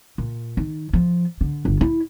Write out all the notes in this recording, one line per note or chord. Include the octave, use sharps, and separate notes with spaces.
A#2
D#3
F3
D3
G1
E4